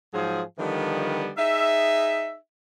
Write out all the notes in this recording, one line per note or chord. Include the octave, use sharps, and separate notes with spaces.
G#2 F3 F#3 G#4
D3 D#3 F3 G3 B3
D#4 G#4 E5